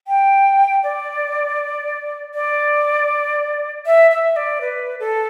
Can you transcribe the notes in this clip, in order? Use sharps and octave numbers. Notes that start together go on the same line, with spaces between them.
G5
D5
D5
E5
E5
D5
B4
A4